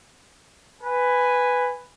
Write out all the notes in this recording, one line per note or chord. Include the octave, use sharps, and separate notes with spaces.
B4 G#5